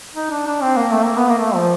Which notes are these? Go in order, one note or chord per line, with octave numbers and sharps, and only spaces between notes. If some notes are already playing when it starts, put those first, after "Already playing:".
D#4
D4
D4
C4
A#3
A3
A#3
B3
A#3
A3
F3